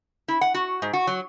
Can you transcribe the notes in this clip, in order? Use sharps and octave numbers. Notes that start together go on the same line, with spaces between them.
E4
F#5
F#4
G#2
F#4
F#3